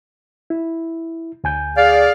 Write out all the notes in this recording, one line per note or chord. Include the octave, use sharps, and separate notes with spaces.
E4
D2 G#5 G6
G#4 D5 F5